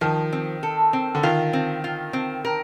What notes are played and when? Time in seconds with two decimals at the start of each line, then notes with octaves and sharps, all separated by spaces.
0.01 D#3 F3
0.33 C4
0.63 A4
0.93 C4
1.15 D3
1.23 D#3 F4
1.53 C4
1.84 F4
2.13 C4
2.45 A#4